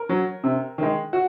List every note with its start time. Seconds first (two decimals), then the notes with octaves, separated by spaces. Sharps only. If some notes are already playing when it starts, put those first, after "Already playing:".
Already playing: A#4
0.09 F#3
0.44 C3
0.78 D#3 G#3
1.13 F#4